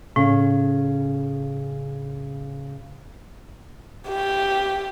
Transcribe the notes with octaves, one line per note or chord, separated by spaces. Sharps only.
A2 C#3
G4